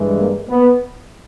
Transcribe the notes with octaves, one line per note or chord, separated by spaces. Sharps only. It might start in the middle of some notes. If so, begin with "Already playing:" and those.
Already playing: G2 E3 G#3
A#3
B3